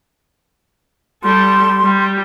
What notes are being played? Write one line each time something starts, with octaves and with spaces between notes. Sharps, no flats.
G3 A4 C6
G3